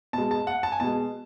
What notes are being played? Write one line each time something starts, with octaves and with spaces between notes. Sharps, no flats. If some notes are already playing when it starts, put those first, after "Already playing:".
B2 G#3 A5
A5
F#5
A5
G#5
B2 G#3 A5